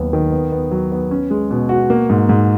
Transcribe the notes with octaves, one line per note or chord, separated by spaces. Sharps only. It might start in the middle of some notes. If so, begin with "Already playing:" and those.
Already playing: D#2 F#3 B3
D#3
B3
B3
F#3
B3
C#4
G#3
B2
F#4
A#3
G#2
G#2